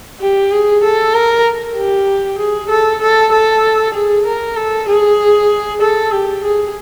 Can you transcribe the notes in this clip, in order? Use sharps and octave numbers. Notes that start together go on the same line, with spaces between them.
G4
G#4
A4
A#4
G4
G#4
A4
A4
A4
G#4
A#4
A4
G#4
A4
G4
G#4